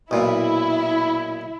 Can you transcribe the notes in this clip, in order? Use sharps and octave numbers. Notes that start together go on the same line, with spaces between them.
B1 A#2 E4